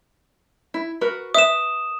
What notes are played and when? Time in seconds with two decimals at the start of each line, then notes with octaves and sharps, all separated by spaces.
0.74 E4
1.01 F#4 A#4 B4
1.34 B4 E5 D#6 E7